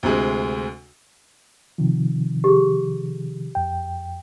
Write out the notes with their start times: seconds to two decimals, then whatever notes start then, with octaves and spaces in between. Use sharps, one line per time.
0.03 D2 C3 G#3
1.78 C3 D#3 F3
2.44 G4 G#4
3.55 F2 G5